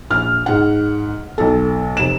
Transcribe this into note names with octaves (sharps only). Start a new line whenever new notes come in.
A#1 F6
G#2 F#5
B1 A4
F1 E7